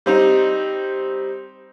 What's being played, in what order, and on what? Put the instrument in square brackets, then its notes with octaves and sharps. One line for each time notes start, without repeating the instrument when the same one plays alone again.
[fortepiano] G3 C4 D#4